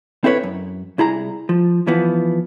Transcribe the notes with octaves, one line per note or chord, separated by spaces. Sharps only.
C4 E4 A4 B4 C#5
F#2
C2 E4 G#4 A#5
F3
E3 F3 B3